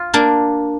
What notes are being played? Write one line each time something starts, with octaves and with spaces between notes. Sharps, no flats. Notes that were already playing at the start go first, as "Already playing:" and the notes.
Already playing: F4
A#3 D4